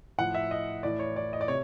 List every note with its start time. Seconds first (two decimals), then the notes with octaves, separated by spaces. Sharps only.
0.18 A2 F3 F#5
0.35 E5
0.51 D#5
0.83 A2 E3 D5
0.99 C#5
1.16 D5
1.33 D#5
1.41 D5
1.48 C3 C#5